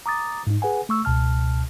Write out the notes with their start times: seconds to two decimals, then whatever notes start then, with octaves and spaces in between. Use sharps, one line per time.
0.06 A#5 D6 D#6 A6
0.47 G#2 D#4
0.62 G#4 B4 F#5 G#5
0.89 A3 C#6 E6
1.05 C#2 B2 A5 F6